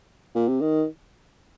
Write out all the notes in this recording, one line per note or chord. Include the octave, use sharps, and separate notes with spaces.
A#2
C3
D#3